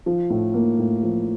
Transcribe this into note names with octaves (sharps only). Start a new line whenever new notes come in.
F3
A2
A#3
A2
F3